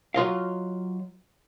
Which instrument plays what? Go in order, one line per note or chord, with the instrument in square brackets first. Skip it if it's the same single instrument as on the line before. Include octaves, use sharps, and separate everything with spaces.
[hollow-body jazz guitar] F#3 F4 D#5 F5